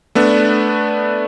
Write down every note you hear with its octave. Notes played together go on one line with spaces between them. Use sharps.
A3 B3 D4